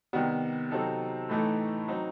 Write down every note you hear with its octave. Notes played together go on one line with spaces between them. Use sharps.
C3 D#3 G3 B3
C3 F#3 C4 D#4 A4
A2 E3 A3 D#4 A4
F#3 C4 D#4